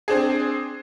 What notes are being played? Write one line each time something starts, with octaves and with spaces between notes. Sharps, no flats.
C4 D4 G#4